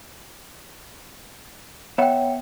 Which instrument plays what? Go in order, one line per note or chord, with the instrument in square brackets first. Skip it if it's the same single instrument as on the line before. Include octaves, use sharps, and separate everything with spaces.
[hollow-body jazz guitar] B3 E5 F#5 [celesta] C#5 G5